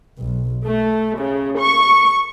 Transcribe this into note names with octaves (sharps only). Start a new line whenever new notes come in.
B1
A3
C#3
C#6